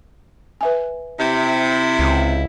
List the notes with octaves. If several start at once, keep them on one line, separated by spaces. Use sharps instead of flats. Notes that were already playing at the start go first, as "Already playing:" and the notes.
B4 E5 G#5
C3 E4
C#2